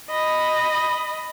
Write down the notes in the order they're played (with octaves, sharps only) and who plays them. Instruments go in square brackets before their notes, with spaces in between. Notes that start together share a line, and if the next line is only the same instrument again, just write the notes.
[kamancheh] D#5 B5